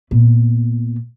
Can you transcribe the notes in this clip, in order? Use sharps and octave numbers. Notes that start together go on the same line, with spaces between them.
A#2 B3